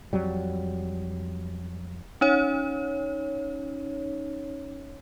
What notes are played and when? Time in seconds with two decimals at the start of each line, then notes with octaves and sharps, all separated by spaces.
0.13 F2 F#3 G3
2.21 C#4 D#4 C#5